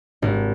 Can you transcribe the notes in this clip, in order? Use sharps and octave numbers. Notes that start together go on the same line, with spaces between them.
G#1